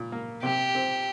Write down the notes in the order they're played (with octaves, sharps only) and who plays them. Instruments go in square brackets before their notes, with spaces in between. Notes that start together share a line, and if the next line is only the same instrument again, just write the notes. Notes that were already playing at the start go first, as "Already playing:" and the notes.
Already playing: [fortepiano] A#2
A#3
[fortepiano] C3 [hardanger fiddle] G4
[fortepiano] C4